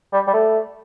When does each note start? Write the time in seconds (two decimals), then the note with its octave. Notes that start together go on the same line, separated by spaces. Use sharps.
0.13 G3
0.28 G3
0.34 A3